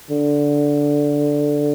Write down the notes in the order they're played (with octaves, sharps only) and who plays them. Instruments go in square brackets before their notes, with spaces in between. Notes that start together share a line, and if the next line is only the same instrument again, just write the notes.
[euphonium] D3